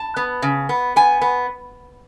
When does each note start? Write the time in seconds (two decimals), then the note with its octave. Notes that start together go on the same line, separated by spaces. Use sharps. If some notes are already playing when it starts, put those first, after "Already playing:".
Already playing: A5
0.16 B3
0.42 C#3
0.69 B3
0.96 B3 G#5
1.22 B3